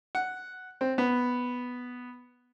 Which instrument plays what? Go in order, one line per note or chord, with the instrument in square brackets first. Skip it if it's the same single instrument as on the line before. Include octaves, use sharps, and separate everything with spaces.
[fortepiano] F#5
C4
B3